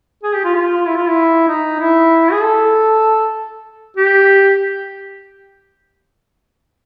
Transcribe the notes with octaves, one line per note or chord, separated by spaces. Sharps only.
G#4
G4
F4
F4
E4
F4
E4
D#4
E4
G#4
A4
G4